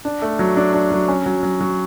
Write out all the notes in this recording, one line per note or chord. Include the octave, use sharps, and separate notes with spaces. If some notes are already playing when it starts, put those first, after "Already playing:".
D4
A3
F#3
D4
D4
F#3
C#4
F#3
F#3
F#3